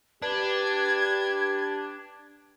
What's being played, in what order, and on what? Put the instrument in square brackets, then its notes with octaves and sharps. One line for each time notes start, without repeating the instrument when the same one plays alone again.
[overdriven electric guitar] D4 [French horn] G4 [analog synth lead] B4 [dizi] G#6